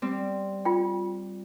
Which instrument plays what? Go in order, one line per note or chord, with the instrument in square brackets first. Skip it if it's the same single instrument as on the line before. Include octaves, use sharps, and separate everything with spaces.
[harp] G3 C4
[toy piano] F4 G5